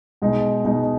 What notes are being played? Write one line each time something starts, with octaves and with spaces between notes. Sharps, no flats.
B2 G#3 D#4
B2 G#3 D#4